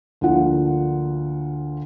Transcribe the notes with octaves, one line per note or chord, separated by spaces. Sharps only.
D2 D3 F3 A#3 F4 F#5